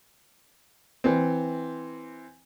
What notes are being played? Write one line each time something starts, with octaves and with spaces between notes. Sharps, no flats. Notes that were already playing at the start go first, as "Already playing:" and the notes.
E3 C4